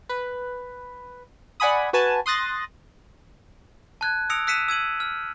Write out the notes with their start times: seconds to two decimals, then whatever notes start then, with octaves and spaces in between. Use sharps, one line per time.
0.09 B4
1.60 D5 F#5 G#5 B5 D#6
1.93 F#4 B4 G#5 A5
2.26 C6 D#6 F#6 A6 A#6
4.01 A5 F#6 G#6
4.30 D#6 E6 A#6 C#7 D7 F7
4.47 E6 F#6 B6 C#7 D#7 E7
4.68 E6 G#6 D#7 F#7
5.00 F6